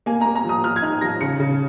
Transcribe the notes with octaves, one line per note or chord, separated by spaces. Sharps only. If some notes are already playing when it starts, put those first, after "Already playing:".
A#3 G#5
A#3 A#5
A#5
F3 D#6
F3 F6
G#6
D#4 F6
F3 A#6
C#3 C#7
C#3